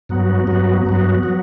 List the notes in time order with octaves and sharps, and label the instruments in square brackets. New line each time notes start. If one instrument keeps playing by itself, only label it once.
[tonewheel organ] G2 F#3 B3 F#4
G2 F#3 B3 F#4
G2 F#3 B3 F#4
F#3 B3 F#4